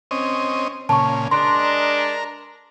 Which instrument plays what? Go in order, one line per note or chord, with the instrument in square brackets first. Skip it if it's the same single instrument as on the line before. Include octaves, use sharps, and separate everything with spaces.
[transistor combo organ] C4 C#4 D#5
[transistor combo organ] A#2 C#3 [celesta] A5 C#6
[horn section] G#3 D4 [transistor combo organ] A#4 [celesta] C6